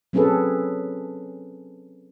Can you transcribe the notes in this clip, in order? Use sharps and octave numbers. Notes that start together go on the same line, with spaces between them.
F#3 C4 C#4 G#4 A4 B4